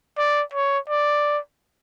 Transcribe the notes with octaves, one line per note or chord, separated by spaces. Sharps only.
D5
C#5
D5